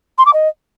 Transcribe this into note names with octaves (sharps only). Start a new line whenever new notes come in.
C6
D6
D#5